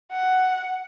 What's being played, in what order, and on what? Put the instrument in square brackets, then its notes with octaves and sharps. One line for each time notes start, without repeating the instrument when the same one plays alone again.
[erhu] F#5